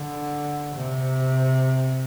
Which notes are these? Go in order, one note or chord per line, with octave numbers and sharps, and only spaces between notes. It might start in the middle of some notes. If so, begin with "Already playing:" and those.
Already playing: D3
C3